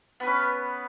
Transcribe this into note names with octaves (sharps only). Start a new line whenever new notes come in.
B3 C#4 B4